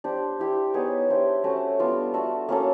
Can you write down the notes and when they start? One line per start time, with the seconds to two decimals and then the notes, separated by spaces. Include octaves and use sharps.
0.04 D4 G4 C5
0.39 E4 G4 C5
0.74 B3 D#4 G#4 C#5
1.09 D4 G4 C5 E5
1.44 A3 C#4 F#4
1.79 G3 B3 D4 F4
2.14 A3 D4 F#4
2.49 A#3 C#4 F#4 A4